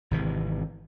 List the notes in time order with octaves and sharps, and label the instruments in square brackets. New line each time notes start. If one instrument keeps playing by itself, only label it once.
[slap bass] G#1 C3 E3